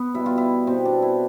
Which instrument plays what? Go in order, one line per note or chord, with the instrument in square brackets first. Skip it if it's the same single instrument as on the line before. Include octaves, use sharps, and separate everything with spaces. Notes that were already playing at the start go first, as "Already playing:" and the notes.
Already playing: [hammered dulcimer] B3
B2 G3 E4
F4
E4
B2 G3 C4
D4
E4